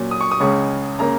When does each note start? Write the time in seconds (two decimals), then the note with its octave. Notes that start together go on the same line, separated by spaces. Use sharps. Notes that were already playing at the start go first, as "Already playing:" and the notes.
Already playing: A#2 F#3 C#4
0.11 D#6
0.21 C#6
0.31 D#6
0.40 C#2 C#3 G#3 C#4 C#6
0.99 C#3 A#3 C#4 A#5